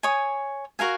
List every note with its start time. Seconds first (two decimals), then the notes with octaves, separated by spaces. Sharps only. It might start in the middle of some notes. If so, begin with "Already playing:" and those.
0.03 C#5 G#5 D#6
0.79 F#4 A#4 F5 G#5